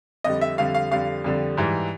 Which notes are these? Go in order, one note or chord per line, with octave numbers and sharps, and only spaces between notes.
F2 D3 G3 D#5
E5
F2 D3 G3 F5
F5
F2 D3 G3 F5
F2 D3 G3
G#2 E3 G3